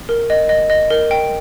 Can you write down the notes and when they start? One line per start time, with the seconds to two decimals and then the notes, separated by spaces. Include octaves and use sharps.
0.09 A#4
0.30 D#5
0.49 D#5
0.70 D#5
0.90 A#4
1.11 G5